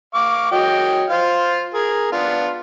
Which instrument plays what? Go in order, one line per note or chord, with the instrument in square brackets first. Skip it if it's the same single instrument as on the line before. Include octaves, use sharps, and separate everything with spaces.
[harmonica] F5 C#6 D6
F#3 D#5 G5
F4 C5 F5
G#4 A#4
B3 D4 F4